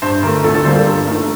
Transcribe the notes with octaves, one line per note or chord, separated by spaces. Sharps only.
G2 C5
D3 A3 A#4
D2 A4
A4
D3 G3 A#3 C5
A4
G2 A4
D#3 A3 A#4